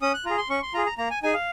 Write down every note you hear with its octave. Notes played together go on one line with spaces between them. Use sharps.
C#4 D#6
F#6
F4 G#4 A#5
C6
C#4 C#6
C6
F4 G#4 A#5
A#5
A#3 A#5
G#5
D#4 G#4 G#5
F5